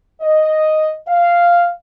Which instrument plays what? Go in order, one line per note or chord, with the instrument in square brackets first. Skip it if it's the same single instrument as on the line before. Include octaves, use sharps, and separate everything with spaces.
[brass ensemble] D#5
F5